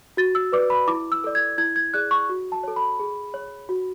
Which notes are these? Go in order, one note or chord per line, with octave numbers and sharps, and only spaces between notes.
F#4 A6
E6
B4 D5 D6
B5
E4 D6
E6
A4 D5
G#6
E4 G#6
G#6
G#4 D5 F#6
C#6
F#4
A5
A4 C#5
B5
G#4
C#5
F#4